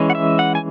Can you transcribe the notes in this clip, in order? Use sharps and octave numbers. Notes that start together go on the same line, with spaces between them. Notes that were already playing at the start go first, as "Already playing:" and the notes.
Already playing: E3 G#3 C#4
F#5
E5
F#5
G#5